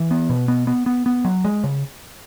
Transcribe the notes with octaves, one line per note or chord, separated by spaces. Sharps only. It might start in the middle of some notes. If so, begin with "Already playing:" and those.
Already playing: E3
B3
B2
B3
B3
B3
B3
F#3
G#3
C#3